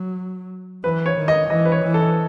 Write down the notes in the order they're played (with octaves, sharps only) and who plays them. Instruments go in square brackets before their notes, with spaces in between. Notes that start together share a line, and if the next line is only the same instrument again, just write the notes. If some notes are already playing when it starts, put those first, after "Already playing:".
Already playing: [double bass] F#3
[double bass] E3 [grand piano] B4
[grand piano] C#5
[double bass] D#3
[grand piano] D#5
[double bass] E3 [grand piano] D#5
[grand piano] B4
C#5
[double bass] E3
[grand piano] A4